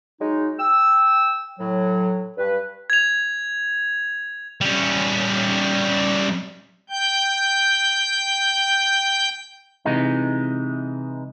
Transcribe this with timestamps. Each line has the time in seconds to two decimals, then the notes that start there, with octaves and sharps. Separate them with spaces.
0.20 F#3 G#3 D#4
0.60 G5 E6
1.59 A2 F#3
2.38 G2 B4
2.90 G#6 F7
4.61 G3 C#4
6.90 G5 G6
9.85 C3 E3 G#3 D#4